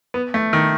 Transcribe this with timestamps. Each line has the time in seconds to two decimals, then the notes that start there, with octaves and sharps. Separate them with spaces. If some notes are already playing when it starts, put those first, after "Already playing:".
0.14 B3
0.34 A3
0.53 D#3